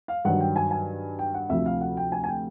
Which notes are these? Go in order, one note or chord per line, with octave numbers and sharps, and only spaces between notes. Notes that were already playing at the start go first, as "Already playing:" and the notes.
F5
G2 D#3 F#3 F#5
G5
G#5
G#5
G5
F#5
D2 C3 F3 E5
F5
F#5
G5
G#5
G#5
G5